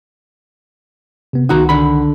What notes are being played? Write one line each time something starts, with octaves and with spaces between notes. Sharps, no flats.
C3 B3
C2 D#3 D#4 F#4 F#5 A#5
D3 B5